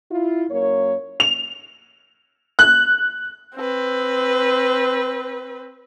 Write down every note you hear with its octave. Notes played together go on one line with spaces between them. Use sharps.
E4 F4
F#2 A#3 C#5
F7
F#6
C4 B4